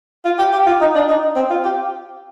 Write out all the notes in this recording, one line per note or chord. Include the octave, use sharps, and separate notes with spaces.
F4
G4
G4
F4
D#4
D4
D#4
C4
F4
G4